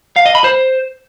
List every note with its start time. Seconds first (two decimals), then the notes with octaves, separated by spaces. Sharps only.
0.16 F5
0.26 D#5
0.35 B5
0.44 C5